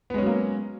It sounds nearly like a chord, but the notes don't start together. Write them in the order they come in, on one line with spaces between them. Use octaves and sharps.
B3 G#3 C#4 F#3 A#3